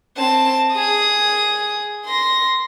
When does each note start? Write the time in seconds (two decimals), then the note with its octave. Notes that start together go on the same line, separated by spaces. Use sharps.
0.17 C4 A5
0.72 G#4 D#6
2.06 C6 A#6